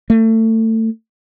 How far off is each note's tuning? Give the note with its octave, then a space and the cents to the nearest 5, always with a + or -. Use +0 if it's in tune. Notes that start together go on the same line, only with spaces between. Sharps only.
A3 +25